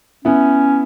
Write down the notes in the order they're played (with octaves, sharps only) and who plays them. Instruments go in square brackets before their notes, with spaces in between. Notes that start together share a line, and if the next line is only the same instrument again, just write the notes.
[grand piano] B3 E4 [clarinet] C#4